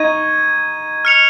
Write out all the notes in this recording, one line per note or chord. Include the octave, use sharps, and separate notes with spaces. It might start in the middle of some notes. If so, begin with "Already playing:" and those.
Already playing: D#4 C#6 G#6 D#7
F6 C#7 F7